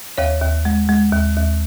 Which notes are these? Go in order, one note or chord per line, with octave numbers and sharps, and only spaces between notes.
D#2 C#5 F5
D#2
G#3
G#3
D#2
D#2